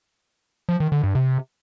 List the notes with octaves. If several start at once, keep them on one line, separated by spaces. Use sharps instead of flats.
F3
D#3
D3
G2
C3